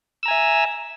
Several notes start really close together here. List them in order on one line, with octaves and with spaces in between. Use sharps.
E6 A#5 G#5 E5